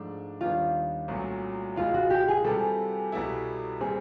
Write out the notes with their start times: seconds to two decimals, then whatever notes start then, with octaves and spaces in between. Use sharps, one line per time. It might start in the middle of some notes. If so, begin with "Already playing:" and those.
Already playing: G#2 F3 A3 D4
0.41 D#2 D#3 G3 B3 D4 F4
1.08 C2 A#2 F#3 A3 C#4
1.76 C#2 B2 G#3 F4
1.94 F#4
2.10 G4
2.28 G#4
2.44 C3 E3 G3 A4
3.12 C2 B2 G3 B3 E4
3.80 A#2 G3 C4 G#4